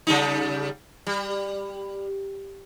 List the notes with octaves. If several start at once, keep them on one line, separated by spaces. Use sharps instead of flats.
C#3 G3 D#4
G3